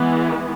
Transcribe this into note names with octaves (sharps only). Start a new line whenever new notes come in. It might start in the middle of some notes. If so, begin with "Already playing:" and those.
Already playing: E3 G#3 B3